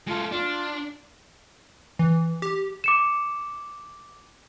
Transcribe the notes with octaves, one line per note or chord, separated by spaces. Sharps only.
G#3 F4 A4
D4 F4
E3
G4
D6 C#7 E7